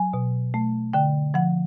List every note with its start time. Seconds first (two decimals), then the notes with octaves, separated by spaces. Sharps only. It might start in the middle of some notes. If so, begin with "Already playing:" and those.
Already playing: F#3 G#5
0.13 B2
0.54 A3
0.93 D3 G5
1.34 F3 F#5